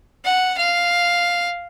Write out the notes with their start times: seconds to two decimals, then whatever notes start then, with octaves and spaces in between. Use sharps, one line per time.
0.25 F#5
0.58 F5